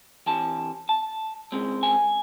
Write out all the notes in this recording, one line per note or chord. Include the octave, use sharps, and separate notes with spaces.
C3 E3 A5
A5
C#3 G#3 C4
G#5